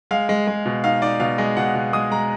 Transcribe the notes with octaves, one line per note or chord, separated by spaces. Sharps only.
G#3 F5
G#3
G#3
B2
D#4 F5
D#4 D5
B2 F5
G#3 D#5
B2 F#5
B2
G#3 D#6
G#3 A#5